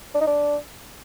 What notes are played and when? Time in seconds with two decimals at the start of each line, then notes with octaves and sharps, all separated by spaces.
0.15 D4
0.21 D#4
0.27 D4